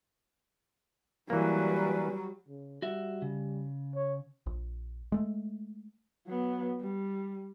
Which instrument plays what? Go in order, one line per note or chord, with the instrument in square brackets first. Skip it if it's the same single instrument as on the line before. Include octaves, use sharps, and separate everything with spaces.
[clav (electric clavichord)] E3 A#3 [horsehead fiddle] F#3 G3 [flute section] B4 D5 G#5
[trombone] C#3
[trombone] G3 [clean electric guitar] F#4 E5
[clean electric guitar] C#3
[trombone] C#5
[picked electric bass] A#1
G#3 A3
[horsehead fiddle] F#3 B3
G3